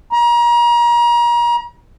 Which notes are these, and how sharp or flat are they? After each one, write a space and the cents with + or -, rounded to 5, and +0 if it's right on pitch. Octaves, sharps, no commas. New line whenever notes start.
A#5 +35